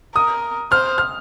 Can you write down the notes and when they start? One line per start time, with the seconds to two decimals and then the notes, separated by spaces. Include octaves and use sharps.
0.15 A#4 D#6
0.72 C5 F6
0.98 F6